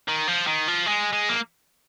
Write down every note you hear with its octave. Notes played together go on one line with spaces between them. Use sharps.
D#3
F3
D#3
F3
G#3
G#3
A#3